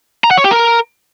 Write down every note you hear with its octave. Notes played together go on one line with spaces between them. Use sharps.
A#5
F#5
C#5
G4
A#4